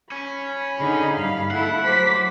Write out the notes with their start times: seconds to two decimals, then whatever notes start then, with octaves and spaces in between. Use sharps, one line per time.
0.12 C#4 B5
0.78 D3 D#4 G#4
1.16 G2 F5
1.51 A3 E4 A4 F#5
1.83 F#3 C5 D6 B6